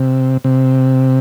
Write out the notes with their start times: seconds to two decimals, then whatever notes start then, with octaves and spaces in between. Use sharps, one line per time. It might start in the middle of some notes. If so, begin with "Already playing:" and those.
Already playing: C3
0.44 C3